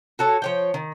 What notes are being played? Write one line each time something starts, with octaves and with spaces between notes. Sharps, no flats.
F#4 A4 C#5
F3 C#5 G5
D#3